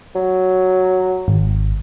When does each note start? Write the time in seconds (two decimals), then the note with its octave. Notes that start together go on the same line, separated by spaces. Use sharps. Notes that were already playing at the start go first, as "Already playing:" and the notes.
0.15 F#3
1.28 G#1